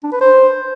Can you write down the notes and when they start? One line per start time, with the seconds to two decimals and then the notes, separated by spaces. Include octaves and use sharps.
0.03 D4
0.12 B4
0.21 C5